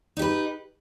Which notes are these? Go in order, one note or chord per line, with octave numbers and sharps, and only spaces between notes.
D#4 G4 B4